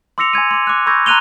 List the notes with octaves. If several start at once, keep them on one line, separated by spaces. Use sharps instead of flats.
C6 D6 E6 A#6 C#7 F7
G#5 C6 G#6 D#7
C6 D6
D6 F#6
B5 C#6 E6 G6 G#6 A#6
A#5 C6 F#6 D#7 F7 G7